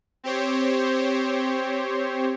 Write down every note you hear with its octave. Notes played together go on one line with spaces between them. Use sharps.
C4 G4 C5 C#5